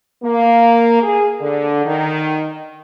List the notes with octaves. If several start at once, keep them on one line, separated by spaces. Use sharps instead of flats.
A#3
G#4
D3
D#3